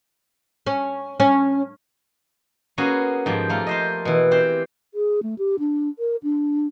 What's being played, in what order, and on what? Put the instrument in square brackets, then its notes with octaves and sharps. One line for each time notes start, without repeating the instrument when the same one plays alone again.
[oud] C#4
C#4
[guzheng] A#3 B3 C#4 F#4 G#4
G#2 F3 G4
A3 A#3 F4
F4 C5 D#5
B2 E3
C4 G4 C5
[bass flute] G#4
A3
G4
D4
A#4
D4